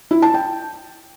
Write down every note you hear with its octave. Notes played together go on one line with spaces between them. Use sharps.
E4
A5
G5